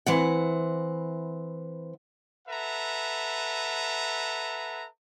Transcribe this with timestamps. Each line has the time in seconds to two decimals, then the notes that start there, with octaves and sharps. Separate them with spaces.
0.06 E3 C4 F#5
2.47 A4 B4 E5 F#5 A#5